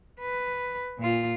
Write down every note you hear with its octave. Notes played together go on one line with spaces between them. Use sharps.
B4
A#2 F4